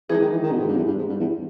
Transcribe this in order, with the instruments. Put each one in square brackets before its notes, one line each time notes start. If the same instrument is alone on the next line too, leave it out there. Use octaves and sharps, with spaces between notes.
[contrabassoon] E3 [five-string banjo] G#3 D#4 G#4
[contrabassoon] D#3
E3
D#3
B2
G#2
G2
E2
G2
G#2
G2
E2